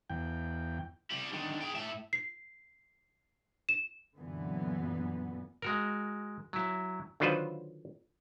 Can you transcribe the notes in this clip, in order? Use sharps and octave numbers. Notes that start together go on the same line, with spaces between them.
E2 G5
G3 E4
D3 D#3
G#4 G5
A2 E5
C7
E7
F#2 A#2 D3 E3 B3
G#3 F#4 A#4
F#3 E4
D3 D#3 F#3 F4 B4 C5